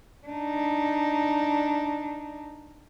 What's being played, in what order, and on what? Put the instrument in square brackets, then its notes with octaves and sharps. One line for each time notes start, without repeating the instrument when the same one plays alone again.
[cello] D4 D#4